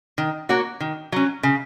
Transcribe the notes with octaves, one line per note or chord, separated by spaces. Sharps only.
D#3
A#3 F#4 C#5
D#3
F#3 C#4
C#3